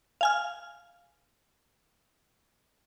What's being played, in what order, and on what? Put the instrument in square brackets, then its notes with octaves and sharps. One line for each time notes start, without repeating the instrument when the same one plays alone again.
[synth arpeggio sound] F5 G#5 F6